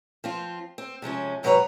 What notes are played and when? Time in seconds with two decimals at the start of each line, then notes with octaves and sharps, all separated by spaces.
0.24 F3 C4 F4
0.78 C4
1.02 C3 F3 G#3 C#4
1.43 G#2 C3 F#3 B4 C#5 A#5